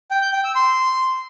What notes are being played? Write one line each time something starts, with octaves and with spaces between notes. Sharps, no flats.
G5
G6
G5
E6
C6